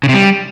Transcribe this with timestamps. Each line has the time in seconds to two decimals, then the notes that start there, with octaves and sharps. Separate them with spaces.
0.03 C#3
0.09 C3
0.14 G3